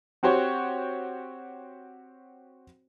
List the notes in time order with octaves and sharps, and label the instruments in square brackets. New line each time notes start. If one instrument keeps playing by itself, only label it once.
[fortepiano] C4 F#4 G4 C5 C#5